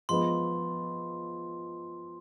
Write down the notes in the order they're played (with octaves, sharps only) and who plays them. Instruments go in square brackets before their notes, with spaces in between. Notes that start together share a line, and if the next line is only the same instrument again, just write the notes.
[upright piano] F3 G#3 B3 [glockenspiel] C6